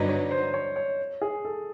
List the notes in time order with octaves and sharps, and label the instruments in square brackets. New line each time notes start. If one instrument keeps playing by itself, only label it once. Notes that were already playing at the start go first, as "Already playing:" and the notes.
Already playing: [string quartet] G2 D3 F#3 B3 D#4 [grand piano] D5 D#5
[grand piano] C#5
C5
C#5
C#5
G#4
A4